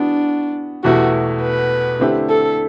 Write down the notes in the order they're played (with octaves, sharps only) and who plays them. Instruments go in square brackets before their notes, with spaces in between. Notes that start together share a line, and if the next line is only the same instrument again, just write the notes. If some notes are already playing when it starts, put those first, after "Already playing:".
Already playing: [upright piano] E3 B3 F#4 [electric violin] D4
[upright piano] E2 B2 A3 E4 G4 [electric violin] F#4
[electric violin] B4
[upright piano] D3 A3 C4 E4 G4
[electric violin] A4